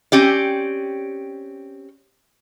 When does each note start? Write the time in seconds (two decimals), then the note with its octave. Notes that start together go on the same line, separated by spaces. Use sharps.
0.12 C4 C#4 G4 D5